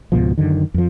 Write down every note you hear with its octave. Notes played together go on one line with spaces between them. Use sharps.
C#2 G#2 B2 F3
F#2 D3 D#3
F2 F3